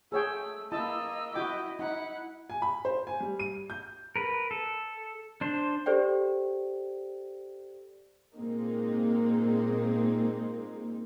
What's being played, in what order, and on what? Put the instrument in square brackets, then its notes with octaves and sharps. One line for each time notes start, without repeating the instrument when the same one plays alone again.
[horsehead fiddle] A3 [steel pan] G#4 C#5 G5 [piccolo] E6
[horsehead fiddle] A#3 D#5 [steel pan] E4 A5 [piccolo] E6
[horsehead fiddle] E4 D#5 [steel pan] F#4 G5 D6
[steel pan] D#4 [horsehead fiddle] E4 [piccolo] F#5
[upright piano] G#5
B5
C5
G#5
G3
D#7
G6
[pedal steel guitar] A#4 B4
A4
D4 C5
[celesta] G4 A4 C5 D5 G5
[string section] A#2 G#3 A#3 C4 D#4